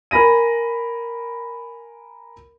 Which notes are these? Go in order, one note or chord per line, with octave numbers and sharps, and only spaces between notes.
A#4 G#5 B5 A#6 D#7